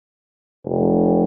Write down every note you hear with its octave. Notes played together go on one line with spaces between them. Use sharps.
F1